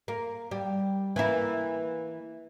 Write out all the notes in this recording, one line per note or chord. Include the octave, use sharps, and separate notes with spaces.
A#3
G3
E3 A#3 E4